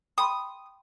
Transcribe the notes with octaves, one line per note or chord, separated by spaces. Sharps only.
G5 B5 C6 D#6